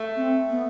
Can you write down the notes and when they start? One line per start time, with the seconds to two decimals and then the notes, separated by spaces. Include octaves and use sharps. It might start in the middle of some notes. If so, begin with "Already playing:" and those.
Already playing: A3
0.16 C4
0.50 B3